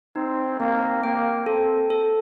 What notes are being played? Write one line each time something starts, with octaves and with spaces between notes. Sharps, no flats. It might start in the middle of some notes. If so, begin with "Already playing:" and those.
C4 D#4
A#3 C4
A#3 G5
C4 A4
A4